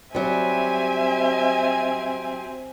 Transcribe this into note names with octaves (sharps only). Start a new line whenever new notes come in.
F#3 G3 C4 E5 G#5